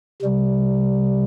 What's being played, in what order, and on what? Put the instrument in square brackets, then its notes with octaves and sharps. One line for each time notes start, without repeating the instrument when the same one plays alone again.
[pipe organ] C3 G3